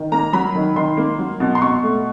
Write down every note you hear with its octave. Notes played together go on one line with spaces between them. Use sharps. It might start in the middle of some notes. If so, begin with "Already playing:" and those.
Already playing: D#3
A#3 A#5
F#3 B5
D#3
D#3 C6
A#3
F#3
B2
C6
B2 C#6
A3